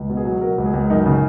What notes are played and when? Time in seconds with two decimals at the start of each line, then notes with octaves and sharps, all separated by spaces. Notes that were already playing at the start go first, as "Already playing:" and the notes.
Already playing: C#2
0.09 B2
0.17 G#4
0.25 F#3
0.41 F#3 A#4
0.58 C#2
0.66 G#4
0.73 C#2
0.90 F#2 D#4
1.06 C#3